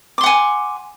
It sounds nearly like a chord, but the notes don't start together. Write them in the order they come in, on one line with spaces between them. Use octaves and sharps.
D6 C6 F#5 G#5